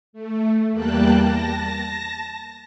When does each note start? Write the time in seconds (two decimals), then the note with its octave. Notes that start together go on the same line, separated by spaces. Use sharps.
0.13 A3
0.72 E2 G3 A#3 G5 A5 F#6
1.18 A5 A#6